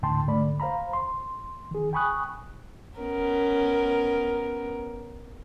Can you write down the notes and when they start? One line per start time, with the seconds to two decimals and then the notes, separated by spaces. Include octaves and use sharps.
0.02 D2 A2 D3 G5 A5 C6
0.27 G#2 D3 A3 D5 B5
0.60 C5 F5 A#5 B5
0.93 C6
1.71 D#3 G#4
1.93 G5 G#5 B5 C#6 D#6 F#6
2.98 B3 C#4 A#4